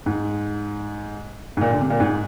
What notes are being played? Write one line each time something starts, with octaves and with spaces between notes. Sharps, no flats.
G#2
G#2
A#2
D3
C3
A#2
G#2